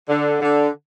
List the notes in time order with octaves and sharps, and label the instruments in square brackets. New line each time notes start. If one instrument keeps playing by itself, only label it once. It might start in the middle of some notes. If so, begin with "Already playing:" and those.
[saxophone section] D3
D3